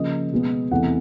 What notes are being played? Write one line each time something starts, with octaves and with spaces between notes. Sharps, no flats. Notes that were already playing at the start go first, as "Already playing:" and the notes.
Already playing: C#3 F3 A#3 D#5
B2 G#3 B3
E2 C3 E3 A3 F#5